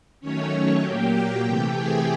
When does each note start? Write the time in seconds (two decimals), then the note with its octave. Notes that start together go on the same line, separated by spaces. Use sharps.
0.21 D#3 F#3 A3 C#4 C#5
0.82 A#2 F#3 A#3 G4 G5
1.13 G4 G5
1.44 C3 E3 A3
1.75 G#4 G#5